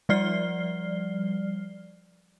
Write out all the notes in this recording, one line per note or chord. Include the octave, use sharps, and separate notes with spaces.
F3 G3 D5 F6 C7 G7